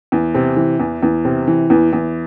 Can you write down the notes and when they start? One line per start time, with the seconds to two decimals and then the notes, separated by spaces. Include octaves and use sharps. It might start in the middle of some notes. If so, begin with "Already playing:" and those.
0.12 E2
0.35 C3
0.56 E3
0.80 E2
1.03 E2
1.25 C3
1.47 E3
1.70 E2
1.93 E2